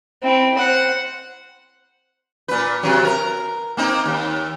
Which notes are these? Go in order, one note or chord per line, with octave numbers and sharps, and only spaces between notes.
C4 E4
C5 F#5
A#2 B4
C3 E3 F#3
A#4
A#3 C4 D#4
D#2